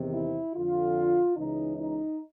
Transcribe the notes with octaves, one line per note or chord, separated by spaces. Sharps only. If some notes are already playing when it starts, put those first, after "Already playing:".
Already playing: E2 C3 D#3
E4
F2 D3 F4
C#2 C#3 E3 D#4
D#4